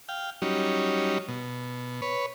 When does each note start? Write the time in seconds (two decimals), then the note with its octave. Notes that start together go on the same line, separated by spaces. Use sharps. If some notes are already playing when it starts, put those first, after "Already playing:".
0.09 F5 G5
0.42 F#3 G3 C#4 D#4
1.28 B2
2.02 B4 C#5